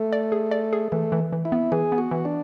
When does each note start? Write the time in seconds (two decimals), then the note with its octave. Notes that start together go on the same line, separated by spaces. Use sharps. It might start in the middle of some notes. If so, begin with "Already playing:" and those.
Already playing: A3
0.13 D5
0.32 G#4
0.51 D5
0.73 G#4
0.92 E3 A3
1.12 E3
1.32 E3
1.45 E4
1.52 B3
1.72 E3 G#4
1.92 B3
1.98 F#4
2.11 E3
2.25 D4